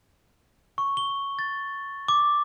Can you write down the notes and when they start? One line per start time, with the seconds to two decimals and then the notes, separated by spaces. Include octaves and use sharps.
0.78 C#6
0.97 G7
1.39 A6
2.08 D6